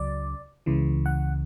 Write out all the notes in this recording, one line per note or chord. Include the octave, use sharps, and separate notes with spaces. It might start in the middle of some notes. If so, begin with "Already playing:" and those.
Already playing: C#2 C#3 F#3 D5
C#2 C#3 E3
F#5